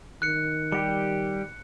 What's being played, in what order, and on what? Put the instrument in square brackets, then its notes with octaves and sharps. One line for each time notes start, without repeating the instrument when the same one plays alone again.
[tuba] D#3 [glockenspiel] F#6 C#7
[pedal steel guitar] G3 G4 [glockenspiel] C#7